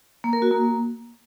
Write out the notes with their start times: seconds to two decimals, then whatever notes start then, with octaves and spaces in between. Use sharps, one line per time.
0.24 A#3
0.33 A#4
0.42 F#4
0.51 A#3